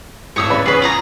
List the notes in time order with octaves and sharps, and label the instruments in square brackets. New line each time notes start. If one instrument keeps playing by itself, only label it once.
[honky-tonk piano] G#1 A2 [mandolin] C#5 D#6 E6
[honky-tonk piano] C#3 B4 D5
[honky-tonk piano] E2 C#3 C#5 [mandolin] G#4 B4
[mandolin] F4 G#4 A#5